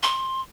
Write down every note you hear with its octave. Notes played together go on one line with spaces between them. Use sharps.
C6